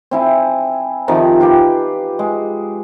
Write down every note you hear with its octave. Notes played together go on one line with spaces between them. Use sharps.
C4 E4 G#5
C3 D#3 F3
F4 G4 B4
G#3